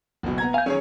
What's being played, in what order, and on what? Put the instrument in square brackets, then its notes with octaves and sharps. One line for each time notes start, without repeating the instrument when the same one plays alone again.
[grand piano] F#1 B2
B3 A#5 G#6
[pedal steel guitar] F5 G6 [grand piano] G#5
[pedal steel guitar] D#3 F3 F#3 [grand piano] C#4 G#4 C#5